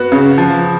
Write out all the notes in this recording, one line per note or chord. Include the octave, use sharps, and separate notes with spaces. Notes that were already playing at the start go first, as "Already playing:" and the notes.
Already playing: B3 F#4
C#3
F3